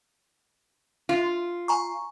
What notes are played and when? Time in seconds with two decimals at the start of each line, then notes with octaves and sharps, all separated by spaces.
1.09 F4
1.68 G#5 A#5 C#6